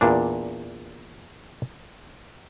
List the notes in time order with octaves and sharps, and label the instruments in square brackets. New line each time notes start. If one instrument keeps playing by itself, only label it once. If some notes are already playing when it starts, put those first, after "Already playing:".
[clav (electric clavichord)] E2 A#2 D4